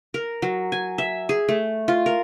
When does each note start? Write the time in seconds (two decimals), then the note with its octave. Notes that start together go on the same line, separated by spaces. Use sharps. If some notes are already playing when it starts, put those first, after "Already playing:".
0.14 A#4
0.42 F#3
0.72 G#5
0.98 E5
1.29 G#4
1.48 A3
1.88 F4
2.06 A#4